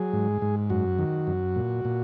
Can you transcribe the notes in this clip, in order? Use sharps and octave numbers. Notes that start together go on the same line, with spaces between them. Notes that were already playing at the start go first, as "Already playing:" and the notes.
Already playing: F#3 G#4
G#2
G#2
F#2 F#4
D#3
F#2
A#2
A#2